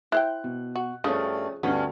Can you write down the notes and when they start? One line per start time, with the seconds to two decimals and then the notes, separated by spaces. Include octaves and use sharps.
0.12 E4 C5 G5 F#6
0.44 B2
0.76 F#4
1.04 G2 C#3 F3 A3 C#4 D#6
1.63 D2 G2 B3 C#4